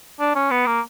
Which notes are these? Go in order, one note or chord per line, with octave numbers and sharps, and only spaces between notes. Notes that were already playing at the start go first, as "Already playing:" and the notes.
D4
C#4
B3
A#3